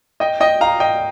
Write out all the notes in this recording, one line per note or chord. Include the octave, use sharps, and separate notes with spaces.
D#5 G5
D#5 G5
F5 A#5
D#5 G5